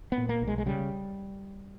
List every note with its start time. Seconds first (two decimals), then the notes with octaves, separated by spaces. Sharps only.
0.12 B3
0.18 A#2
0.29 A#3
0.42 B1
0.47 G#3
0.58 G#3
0.66 C#3 G3